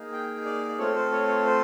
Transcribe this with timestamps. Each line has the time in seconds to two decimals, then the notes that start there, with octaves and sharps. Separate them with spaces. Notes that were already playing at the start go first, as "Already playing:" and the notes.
Already playing: A#3 D#4 G#4
0.12 G5
0.46 D5
0.78 A3 C4 F4 A4 C#5
0.95 C5
1.12 C#5
1.28 C#5
1.45 C5